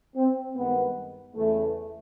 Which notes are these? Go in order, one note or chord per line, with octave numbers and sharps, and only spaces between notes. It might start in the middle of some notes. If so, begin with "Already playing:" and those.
C4
G2 D#3 G#3 B3
E2 C#3 E3 A3